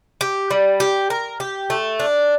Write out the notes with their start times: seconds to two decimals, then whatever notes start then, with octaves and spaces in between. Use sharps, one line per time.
0.21 G4
0.51 G3
0.80 G4
1.10 A#4
1.40 G4
1.70 A3
2.00 D4